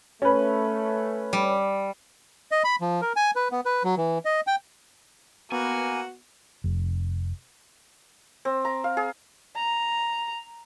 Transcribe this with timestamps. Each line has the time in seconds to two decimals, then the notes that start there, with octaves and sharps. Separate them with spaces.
0.22 A3 C#4 B4
1.33 G3
2.51 D#5
2.64 B5
2.81 F3
3.02 A#4
3.16 G#5
3.36 B4
3.52 B3
3.65 B4
3.84 F#3
3.98 E3
4.25 D#5
4.47 G5
5.52 A#3 B3 F#4 G#5
6.64 F1
8.45 C4
8.65 A#5
8.84 F5
8.97 G#4
9.56 A#5